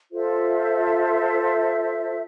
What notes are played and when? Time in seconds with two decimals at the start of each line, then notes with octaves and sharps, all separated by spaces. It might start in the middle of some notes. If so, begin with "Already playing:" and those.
0.11 F4 A4 C5 E5